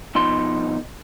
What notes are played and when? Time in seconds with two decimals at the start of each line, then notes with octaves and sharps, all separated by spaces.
0.15 B2 F3 D#4 C6